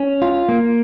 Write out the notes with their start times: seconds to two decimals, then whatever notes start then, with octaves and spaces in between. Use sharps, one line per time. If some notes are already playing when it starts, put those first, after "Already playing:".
Already playing: C#4
0.22 F4
0.49 A#3